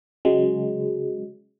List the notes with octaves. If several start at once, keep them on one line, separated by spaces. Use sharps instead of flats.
C#3 F#3 G#3